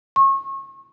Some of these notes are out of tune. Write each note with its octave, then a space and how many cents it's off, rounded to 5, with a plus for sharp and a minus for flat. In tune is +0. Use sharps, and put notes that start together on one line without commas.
C#6 -30